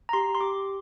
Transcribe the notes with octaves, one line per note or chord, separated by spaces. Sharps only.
A#5
G4 C6
C6
G4 D6